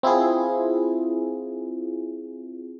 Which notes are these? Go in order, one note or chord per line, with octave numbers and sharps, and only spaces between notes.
C4 E4 F4 G#4